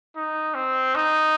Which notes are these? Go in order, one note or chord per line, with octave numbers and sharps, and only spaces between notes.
D#4
C4
D#4